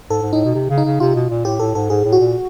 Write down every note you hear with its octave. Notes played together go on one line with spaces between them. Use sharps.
G#2 A4
G#2
A2 D#4
B2
C3
C#3
D#4
C#3
C3 F4
B2
A#2
A2 G4
A2 A4
G#2 A4
G#2 G#4
A2
F#4
A#2